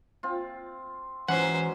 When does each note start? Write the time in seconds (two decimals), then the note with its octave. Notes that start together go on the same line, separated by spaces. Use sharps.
0.23 C4 F4
1.29 G#2 E3 F#3 C#4 C5 F#5